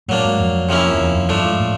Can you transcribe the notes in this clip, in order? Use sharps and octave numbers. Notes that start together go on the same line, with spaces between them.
A2 F#3 A#3 D4
G#2
F2
C3 F3 A#3 C#4 E4
F2
E2
F2
G2 F3 A3 D4
G#2
A2